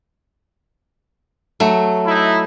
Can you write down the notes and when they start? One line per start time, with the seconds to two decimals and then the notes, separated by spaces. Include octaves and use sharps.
1.60 F#3 A3
2.06 D#4 E4